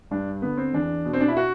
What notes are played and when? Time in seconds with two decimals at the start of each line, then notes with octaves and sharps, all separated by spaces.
0.11 G2 D4
0.42 D3 B3
0.57 C4
0.74 E2 D4
1.05 B2
1.13 C4
1.20 D4
1.28 E4
1.37 F#4